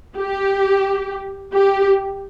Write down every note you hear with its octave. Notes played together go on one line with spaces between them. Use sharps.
G4
G4